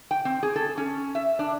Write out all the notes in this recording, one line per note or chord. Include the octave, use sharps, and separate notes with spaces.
G5
C4
G#4
A4
C#4
E5
D4